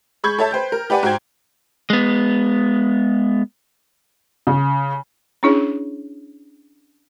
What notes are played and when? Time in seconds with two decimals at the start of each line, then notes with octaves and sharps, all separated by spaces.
0.24 G#3 B5 C#6 G6 G#6
0.39 A4 C#5 E5 A5
0.51 B4 C5 G5 G6
0.72 A#4
0.90 G4 B4 D5 F#5 G#5
1.03 G#2 F#4 C5 G5 G#6
1.90 G#3 B3
4.47 C#3
5.43 C#4 D4 E4 G#4 C#5